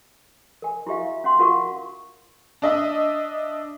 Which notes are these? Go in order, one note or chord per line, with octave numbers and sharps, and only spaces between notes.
A#4 G#5
E4 F#4 G4 E5 F5
C#4 F#5 C6
F4 F#4 A#4 F5 F#5 C#6
D4 D#5 E5